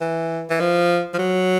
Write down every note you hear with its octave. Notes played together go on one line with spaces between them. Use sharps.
E3
E3
F3
F3
F#3